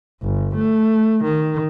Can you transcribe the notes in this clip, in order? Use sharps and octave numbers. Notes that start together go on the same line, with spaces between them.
G1
A3
D#3